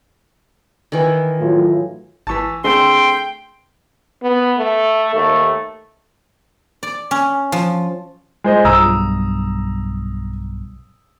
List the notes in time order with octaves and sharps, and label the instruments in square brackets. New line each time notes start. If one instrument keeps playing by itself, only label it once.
[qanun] D#3 E3
[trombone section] A2 F#3 F4
[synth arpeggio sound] G#1 C#6 B6 [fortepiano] E3 A5
[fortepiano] D3 A3 C4 [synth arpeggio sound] G#4 [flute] G5 [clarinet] C6
[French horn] B3
A3
[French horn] D#2 [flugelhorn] A3
[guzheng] D5
C#4
F3
[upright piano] G#3 C5 D#5
[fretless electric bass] B1 G2 [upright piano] A#5 D#6 E6